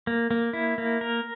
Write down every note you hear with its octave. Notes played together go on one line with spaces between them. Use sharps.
A#3
A#3
E4
A#3
A#4